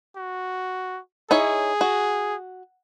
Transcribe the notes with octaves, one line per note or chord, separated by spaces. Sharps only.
F#4
D#4 E4 G#4 C#5
F#4